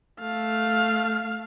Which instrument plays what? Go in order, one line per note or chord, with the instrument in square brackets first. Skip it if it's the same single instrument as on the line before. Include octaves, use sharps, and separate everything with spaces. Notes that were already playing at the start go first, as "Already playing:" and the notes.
[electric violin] A3 F5